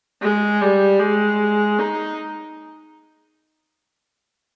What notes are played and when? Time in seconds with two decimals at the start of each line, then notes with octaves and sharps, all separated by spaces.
0.21 G#3
0.61 G3
1.00 G#3
1.79 D#4